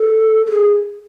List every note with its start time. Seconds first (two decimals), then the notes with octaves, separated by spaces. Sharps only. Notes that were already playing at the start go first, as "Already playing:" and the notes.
Already playing: A4
0.46 A4
0.51 G#4